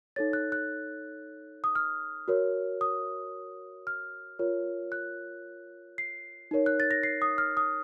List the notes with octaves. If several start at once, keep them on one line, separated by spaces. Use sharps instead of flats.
D#4 A4 C#5 A6
F#6
F#6
D#6
F6
F#4 A#4 C#5
D#6
F6
F4 A#4 C#5
F#6
C7
D#4 A#4 C#5
F#6
A6
A#6
C7
D#6
F6
D#6